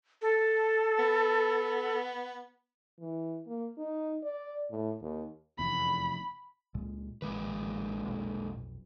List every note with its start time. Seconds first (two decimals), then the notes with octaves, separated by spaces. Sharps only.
0.22 A4
0.99 B3
3.00 E3
3.47 A#3
3.77 D#4
4.23 D5
4.71 A2
5.02 D#2
5.59 F1 E2 B5
6.74 C#2 A#2 G#3
7.22 A1 A#2 D#3 G#3 B4
8.06 F1 B1